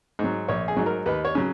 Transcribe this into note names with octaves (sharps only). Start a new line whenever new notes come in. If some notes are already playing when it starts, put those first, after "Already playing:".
G#2 F#3
A#1 C#5
G#4
G#2 F#3
A#4
D#2 B4
C#5
C#3 F#3